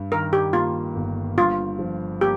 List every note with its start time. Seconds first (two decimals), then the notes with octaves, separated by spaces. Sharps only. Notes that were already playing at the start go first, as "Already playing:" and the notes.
Already playing: G2
0.12 D#3 A#4
0.33 G4
0.53 A#3 F4
0.96 G1
1.38 G2 F4
1.79 F3
2.21 A#3 G4